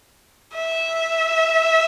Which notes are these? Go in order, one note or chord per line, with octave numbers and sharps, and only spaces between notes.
E5